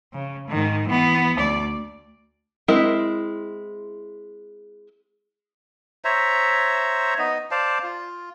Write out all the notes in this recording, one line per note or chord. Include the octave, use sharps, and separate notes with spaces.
C#3
G#2 D#3
E3 B3
D2 D5
G#3 C4 E4 A#4 E5
C5 C#5 E5 A#5
B3 D#4 D#5
C5 D5 F5 A5
F4